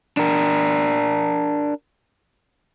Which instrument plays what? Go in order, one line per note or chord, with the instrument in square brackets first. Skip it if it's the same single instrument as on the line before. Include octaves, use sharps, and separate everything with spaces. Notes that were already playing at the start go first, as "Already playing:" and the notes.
[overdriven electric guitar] D4 A#4